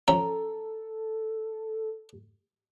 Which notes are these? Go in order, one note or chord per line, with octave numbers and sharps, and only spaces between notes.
F3 C#4 A4 E5 A#5